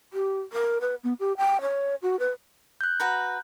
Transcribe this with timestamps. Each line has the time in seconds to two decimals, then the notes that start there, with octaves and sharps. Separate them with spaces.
0.13 G4
0.53 A#4
0.81 B4
1.04 B3
1.20 G4
1.38 G5
1.61 C#5
2.02 F#4
2.19 B4
2.81 F#6 G6
3.00 F#4 B4 A#5